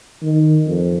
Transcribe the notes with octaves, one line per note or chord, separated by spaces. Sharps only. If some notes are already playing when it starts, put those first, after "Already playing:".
D#3
F2